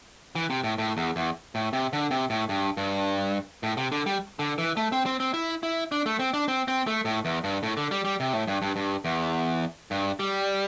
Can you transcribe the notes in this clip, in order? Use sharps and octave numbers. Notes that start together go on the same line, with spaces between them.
E3
C3
A2
A2
E2
E2
A2
C3
D3
C3
A2
G2
G2
A2
C3
D3
G3
D3
E3
A3
C4
C4
C4
E4
E4
D4
A3
C4
D4
C4
C4
A3
A2
E2
G2
A2
D3
G3
G3
C3
A2
G2
G2
G2
E2
G2
G3